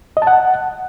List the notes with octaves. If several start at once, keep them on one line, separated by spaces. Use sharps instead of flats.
D#5
A5
F#5